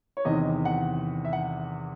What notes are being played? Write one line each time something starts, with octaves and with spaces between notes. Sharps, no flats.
C#5
E2 C3 D#3 D#5
F#5
E5
F#5